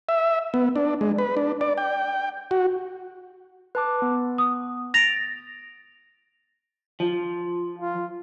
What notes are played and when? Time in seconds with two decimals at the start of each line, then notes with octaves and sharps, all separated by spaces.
0.09 E5
0.54 B3
0.76 D4
1.01 G#3
1.18 B4
1.37 D4
1.61 D5
1.77 G5
2.51 F#4
3.75 B4 A5 D6
4.02 B3
4.38 D#6
4.94 A6 A#6 D7 F7
7.00 F3
7.79 F4